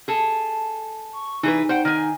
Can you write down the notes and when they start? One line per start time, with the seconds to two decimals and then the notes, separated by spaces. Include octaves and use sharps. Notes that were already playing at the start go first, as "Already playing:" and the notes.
0.08 G#4 A4
1.13 C#6
1.43 E3 D#4 G#4 B4
1.69 C5 F#5 G5
1.85 D#3 G#5